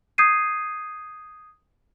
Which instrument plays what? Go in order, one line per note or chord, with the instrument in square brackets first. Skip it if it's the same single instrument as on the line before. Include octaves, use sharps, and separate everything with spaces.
[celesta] D#6 G6 G#6 C7 D#7